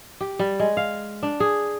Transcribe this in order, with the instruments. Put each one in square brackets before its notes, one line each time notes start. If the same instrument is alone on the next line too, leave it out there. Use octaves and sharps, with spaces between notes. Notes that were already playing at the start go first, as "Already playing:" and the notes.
[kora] G4
G3
G#3
F5
D4
G#4